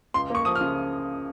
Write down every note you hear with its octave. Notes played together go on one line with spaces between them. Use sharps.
C#2 C6
A#3 C#6
F3 D#6
F6
C#3